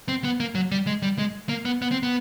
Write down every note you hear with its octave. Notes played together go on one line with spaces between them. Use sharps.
C4
B3
A#3
F#3
G3
G#3
G3
G#3
A#3
B3
B3
C4
B3